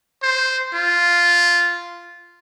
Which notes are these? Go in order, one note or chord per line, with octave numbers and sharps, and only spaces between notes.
C5
F4